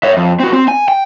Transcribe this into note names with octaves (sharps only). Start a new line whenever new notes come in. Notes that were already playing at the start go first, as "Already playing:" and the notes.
C#5 E5
F2
C4 F#4
C4
G#5
G5